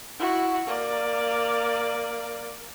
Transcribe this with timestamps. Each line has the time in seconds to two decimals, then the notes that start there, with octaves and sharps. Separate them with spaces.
0.19 E4 F#4
0.67 A#3 D5